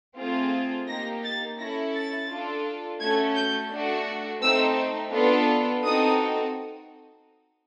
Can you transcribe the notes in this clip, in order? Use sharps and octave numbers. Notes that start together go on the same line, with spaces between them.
A3 C4 F4 G#4
A#3 D#4 G4 A#6
A6
C#4 E4 A4 A#6
A6
D4 F4 A4
A3 C#4 F#4 A4 G#6
G6
A3 D4 F#4
A3 C4 D#4 E6
B3 D4 F4 A4
C4 D#4 F#4 A4 D#6